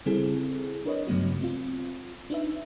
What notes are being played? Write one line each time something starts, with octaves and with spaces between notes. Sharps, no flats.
C#3 G3 C4 E4 G#4 A4
D4 A#4 B4 C#5 D#5
G2 C#3 F#3 A3 B3 F#4
C4 F4
D4 D#4 B4 E5